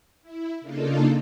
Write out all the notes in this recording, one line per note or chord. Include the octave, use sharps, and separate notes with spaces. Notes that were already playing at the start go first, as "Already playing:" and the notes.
E4
C#3 A#3 D4 D#4 F4 A4